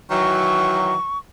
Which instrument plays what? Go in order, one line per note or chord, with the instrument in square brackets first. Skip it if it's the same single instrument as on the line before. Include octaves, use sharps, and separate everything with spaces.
[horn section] D#3 E3 F#3 [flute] C#6